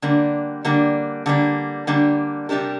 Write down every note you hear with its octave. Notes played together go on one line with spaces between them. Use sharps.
D3 G3 A#3 D4
D3 G3 A#3 D4
D3 G3 A#3 D4
D3 G3 A#3 D4
C3 G3 D4 G4 A#4